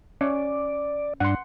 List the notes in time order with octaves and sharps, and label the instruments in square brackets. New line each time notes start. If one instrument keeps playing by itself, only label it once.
[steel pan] C#4 [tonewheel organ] D5
[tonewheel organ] G2 D4 [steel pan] F#5 C6